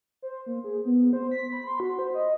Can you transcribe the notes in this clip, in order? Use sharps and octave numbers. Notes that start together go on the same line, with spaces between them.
C5
A#3
G#4
B3
C5
B6
B5
C6
F#4
C5
D#5